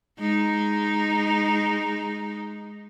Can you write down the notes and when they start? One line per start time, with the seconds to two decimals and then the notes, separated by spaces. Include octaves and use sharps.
0.19 G#3 D#4